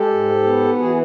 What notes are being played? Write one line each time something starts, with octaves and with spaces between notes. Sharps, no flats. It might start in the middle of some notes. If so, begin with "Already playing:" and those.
Already playing: G#3 G4 A4
G#2
B3
E3 F#4 G#4